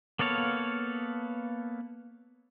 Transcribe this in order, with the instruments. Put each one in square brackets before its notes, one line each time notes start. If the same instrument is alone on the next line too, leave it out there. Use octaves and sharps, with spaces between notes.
[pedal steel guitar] A#3 B3 A4 C#5 F5